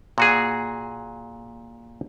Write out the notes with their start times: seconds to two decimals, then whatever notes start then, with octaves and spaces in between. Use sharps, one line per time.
0.18 A#2 F#4 G#4